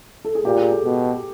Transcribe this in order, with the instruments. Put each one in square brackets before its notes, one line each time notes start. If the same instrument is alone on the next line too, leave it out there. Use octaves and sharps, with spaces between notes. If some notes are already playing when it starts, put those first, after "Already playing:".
[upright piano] A4
G#4
[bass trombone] A#2 [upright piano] G4
[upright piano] G#4
A4
[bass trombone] B2